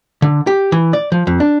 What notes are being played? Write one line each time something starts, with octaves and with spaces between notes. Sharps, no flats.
D3
G4
E3
D5
F3
F2
D4